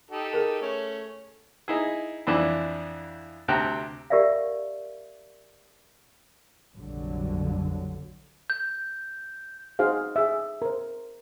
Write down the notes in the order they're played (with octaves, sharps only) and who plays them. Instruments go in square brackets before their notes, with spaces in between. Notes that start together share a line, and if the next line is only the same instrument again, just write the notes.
[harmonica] D#4 G4 A4
[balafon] G#4 A#4
[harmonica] A3 C#4
[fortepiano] D#4 E4 G#4
F2 E3 D4 E4
D2 C3 G5 A5 A#5 F#6
[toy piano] G4 A#4 D5 E5 F5
[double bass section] F1 A#1 G2 D3 F#3
[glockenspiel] G6
[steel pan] D#4 F#4 G#4 C5 F5
G#4 E5
A#4 C5